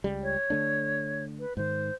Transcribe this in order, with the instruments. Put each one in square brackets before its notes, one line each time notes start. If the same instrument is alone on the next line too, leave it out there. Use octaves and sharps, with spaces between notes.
[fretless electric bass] C#2 C#3 G3
[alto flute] C#5
[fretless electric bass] D3 A3 D4
[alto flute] B4
[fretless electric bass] G#2 D#3 [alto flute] C5